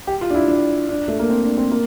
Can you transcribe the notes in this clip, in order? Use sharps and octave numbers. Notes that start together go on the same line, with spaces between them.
G4
F4
D4
E4
D4
D4
A3
A#3
C4
D4
C4
A#3